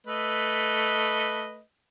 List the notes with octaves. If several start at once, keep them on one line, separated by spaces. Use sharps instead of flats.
A3 B4 D#5